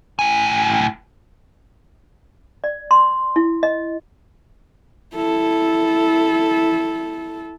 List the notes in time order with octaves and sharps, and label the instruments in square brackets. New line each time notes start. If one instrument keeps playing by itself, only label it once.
[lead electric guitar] A2 G#5
[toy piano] D5
C6
E4
D#5
[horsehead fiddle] E4 A4